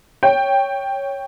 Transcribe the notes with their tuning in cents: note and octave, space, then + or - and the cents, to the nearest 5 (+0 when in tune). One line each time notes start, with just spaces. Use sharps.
C#5 +0 G5 +5